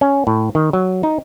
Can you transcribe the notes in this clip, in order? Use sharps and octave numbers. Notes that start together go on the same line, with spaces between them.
C#4
A2
D#3
F#3
D#4